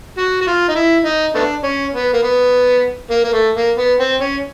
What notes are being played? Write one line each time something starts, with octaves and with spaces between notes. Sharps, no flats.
F#4
F#4
F4
D#4
E4
D#4
A3 B3 D4
C#4
B3
A#3
B3
A#3
A#3
A3
A#3
B3
C4
C#4